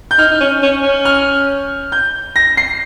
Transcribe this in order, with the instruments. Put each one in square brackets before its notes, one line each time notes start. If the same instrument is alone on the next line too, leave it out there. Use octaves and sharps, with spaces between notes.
[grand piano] G6
[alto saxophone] D#4 [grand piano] F6
[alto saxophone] D#4
C#4
C#4
C#4
[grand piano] F6
G6
A#6
C7